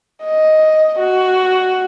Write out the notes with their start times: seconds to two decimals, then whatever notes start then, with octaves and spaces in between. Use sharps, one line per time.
0.24 D#5
0.99 F#4